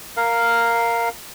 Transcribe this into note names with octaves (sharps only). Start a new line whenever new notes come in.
A#4 F5